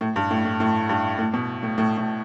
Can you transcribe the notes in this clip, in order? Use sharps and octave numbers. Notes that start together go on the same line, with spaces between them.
A2
G2
A2
A2
A2
G2
A2
B2
A2
A2
A2